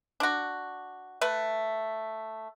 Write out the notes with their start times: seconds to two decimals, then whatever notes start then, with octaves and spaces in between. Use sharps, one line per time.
0.20 D4 F#4
1.21 A3 B4